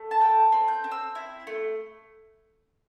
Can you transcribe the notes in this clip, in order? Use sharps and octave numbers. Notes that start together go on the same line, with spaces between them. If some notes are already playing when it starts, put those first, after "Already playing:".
Already playing: A3
A5
A4 G5
C4
G6
C4
E6
E4
A3